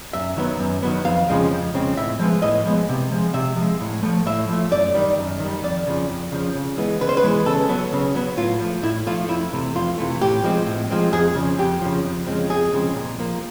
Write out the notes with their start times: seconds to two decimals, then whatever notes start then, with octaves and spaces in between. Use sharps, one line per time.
0.13 F#2 E5
0.37 D#3 F#3 B3
0.60 F#2
0.83 D#3 F#3 B3
1.05 F2 F5
1.29 C#3 F3 G#3 C4
1.52 F2
1.74 C#3 F3 G#3 C4
1.97 A2 E5
2.19 F3 G#3 B3
2.42 A2 D#5
2.66 F3 G#3 B3
2.89 C3
3.12 F3 G#3
3.34 C3 E5
3.57 F3 G#3
3.80 A2
4.03 F3 A3
4.26 A2 E5
4.49 F3 A3
4.71 F#2 D5
4.94 D#3 G3
5.18 F#2
5.40 D#3
5.45 G3
5.63 F2 D5
5.87 C#3 F3
6.10 F2
6.32 C#3 F3
6.55 C#3
6.77 E3 G#3 B3
7.01 C#3 B4
7.09 C5
7.17 B4
7.23 E3 G#3 B3
7.46 C#3 A4
7.69 F#3 B3
7.93 C#3
8.15 F#3 B3
8.37 A2 F4
8.60 F3 A3
8.83 A2 E4
9.07 F3 A3 F4
9.29 F2 E4
9.53 C3 E3 A3
9.75 F2 F4
9.98 C3 E3 A3
10.21 A2 G4
10.44 F3 G#3 C4
10.66 A2
10.90 F3 G#3 C4
11.13 F2 G#4
11.35 C#3 F3
11.58 F2 G4
11.82 C#3 F3
12.05 F2
12.27 C#3 F3 G#3 C4
12.49 F2 G#4
12.73 C#3 F3 G#3 C4
12.95 A#2
13.19 F3 A#3